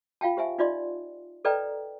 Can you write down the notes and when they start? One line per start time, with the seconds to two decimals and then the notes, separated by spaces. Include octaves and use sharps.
0.21 F4 F5 G5 A5
0.37 G4 C5 E5 G#5
0.58 D#4 F4 D5 D#5 C6
1.45 A4 B4 D5 D#5 G5 A#5